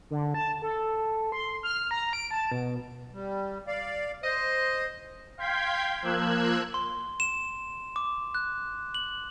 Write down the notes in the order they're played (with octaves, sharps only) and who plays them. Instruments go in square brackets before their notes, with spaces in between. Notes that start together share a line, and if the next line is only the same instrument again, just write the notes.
[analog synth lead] D3
A5
A4
C6
F6
A#5
D7
A5
B2
[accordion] G3
D5 F5
[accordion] C5 [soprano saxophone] D#5
[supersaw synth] F5 G5 C6 G6 G#6 B6
F3 A#3 E6 F#6 G#6
[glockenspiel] C6
E7
D6
F#6
F#7